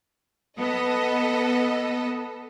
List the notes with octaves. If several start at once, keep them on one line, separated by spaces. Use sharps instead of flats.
B3 A4 D#5